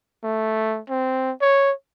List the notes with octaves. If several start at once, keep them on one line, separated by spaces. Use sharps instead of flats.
A3
C4
C#5